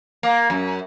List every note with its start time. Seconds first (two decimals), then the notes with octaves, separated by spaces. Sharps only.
0.23 A#3
0.50 F#2